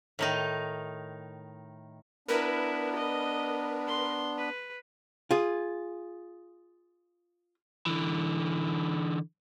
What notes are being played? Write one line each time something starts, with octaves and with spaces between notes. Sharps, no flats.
A2 D#3 D#4
B3 D4 E4 A#4 B4
D#5
C6
B4
F4 G#4
D3 E3